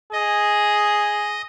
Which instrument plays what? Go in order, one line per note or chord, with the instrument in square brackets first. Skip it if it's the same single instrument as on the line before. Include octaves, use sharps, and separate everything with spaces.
[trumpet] G#4 [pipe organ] D#5